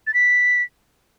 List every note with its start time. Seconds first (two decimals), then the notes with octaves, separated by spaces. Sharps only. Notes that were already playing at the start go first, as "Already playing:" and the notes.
0.07 A6
0.14 B6